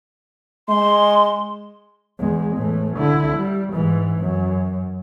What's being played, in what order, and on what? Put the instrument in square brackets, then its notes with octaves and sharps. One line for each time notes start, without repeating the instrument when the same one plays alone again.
[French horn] G#3 [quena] C6
[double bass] E2 G#3
A2 E3
D3 E4
G3
G#2 E3
F#2